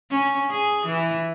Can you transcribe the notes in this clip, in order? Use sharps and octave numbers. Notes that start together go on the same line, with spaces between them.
C#4
G#4
E3